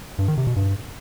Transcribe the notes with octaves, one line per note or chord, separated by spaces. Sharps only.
G2
D#3
C3
B2
G2